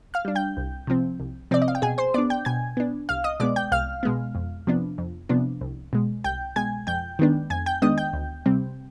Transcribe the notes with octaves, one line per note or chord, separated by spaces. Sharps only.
F5 F6
G3 D4
G5 G6
C2
C3 F3 C4
C2
C3 F3 C4 D5
D#5
F5
G5
B2 G#4 G#5
C5 C6
B3 D4 D5 D6
G5 G6
B2 G#5 G#6
B3 D4
C2 F5 F6
D#5 D#6
B2 G#3 B3 D5 D6
G5 G6
C2 F5 F6
B2 G#3 B3
F2
C3 F3 B3 D4
F2
C3 F3 B3 D4
C2
B2 G#3
C2 G5 G6
B2 G#3 G#5 G#6
F2 G5 G6
D#3 G#3 B3 D4
F2 G#5 G#6
G5 G6
D#3 G#3 B3 D4 D#5 D#6
G5 G6
D2
C3 G3 C4